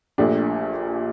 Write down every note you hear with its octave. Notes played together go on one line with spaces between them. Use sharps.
A#1 A#2 A3 D4 G4